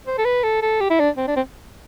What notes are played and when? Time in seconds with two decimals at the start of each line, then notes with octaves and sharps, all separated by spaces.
0.07 C5
0.18 A4
0.25 B4
0.43 A4
0.62 A4
0.81 G4
0.90 E4
1.00 D4
1.17 C4
1.27 D4
1.36 C4